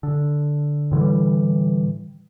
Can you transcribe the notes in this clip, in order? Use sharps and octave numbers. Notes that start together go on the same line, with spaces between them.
D3
A2 D3 E3 G3